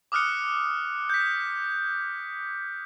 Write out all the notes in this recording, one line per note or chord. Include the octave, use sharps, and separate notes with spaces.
D6 D#6 F6 F#6 C#7
G6 B6